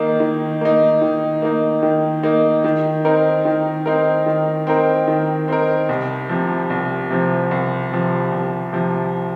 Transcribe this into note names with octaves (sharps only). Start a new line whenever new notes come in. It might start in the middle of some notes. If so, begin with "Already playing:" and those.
Already playing: D#3 A#3 D#4
D#3
A#3 D#4
D#3
A#3 D#4
D#3
A#3 D#4
D#3
C4 D#4 A#4
D#3
C4 D#4 A#4
D#3
C4 D#4 A#4
D#3
C4 D#4 A#4
C2
C3 F3
C2
C3 F3
C2
C3 F3
C2
C3 F3